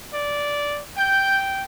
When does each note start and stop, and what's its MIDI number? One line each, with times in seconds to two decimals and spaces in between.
0.13 0.82 74
0.97 1.64 79
0.97 1.41 91